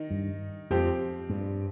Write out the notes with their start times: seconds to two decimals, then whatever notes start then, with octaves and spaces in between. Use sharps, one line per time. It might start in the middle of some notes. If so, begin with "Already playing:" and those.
Already playing: D#3 D#4
0.10 G2
0.70 F2 F3 C4 G4
1.30 G2